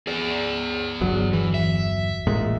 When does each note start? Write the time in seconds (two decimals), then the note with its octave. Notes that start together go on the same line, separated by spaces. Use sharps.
0.07 G#4 D5
1.01 G1 E2 F#3
1.33 E3
1.54 E5
2.27 A1 A#2 G#3